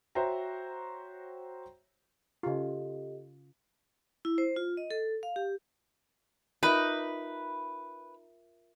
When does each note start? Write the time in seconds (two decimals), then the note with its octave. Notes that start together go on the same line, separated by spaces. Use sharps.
0.15 F#4 C5 C#5 E5 G5 A#5
2.43 C#3 F4 G4 A4 D#5
4.25 E4
4.38 C5
4.56 F4
4.77 D#5
4.90 A4
5.23 F5
5.36 G4
6.63 D#4 F4 A#4 B4 E5 D6